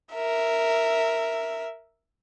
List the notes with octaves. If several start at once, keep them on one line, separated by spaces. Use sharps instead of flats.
A#4 E5